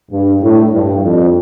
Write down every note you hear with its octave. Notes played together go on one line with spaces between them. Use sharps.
G2
A2
G2
F2